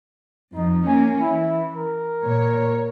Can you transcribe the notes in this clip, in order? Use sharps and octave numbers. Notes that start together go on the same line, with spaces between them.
F2 F3 D#4
A#3 C#4 G#5
E3 E4
A#4
A#2 C#5